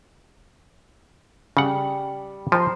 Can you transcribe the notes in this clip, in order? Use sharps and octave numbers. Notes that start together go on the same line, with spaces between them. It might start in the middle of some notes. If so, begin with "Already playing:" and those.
C#3 G3 F#5
F3 C5 A#5 C6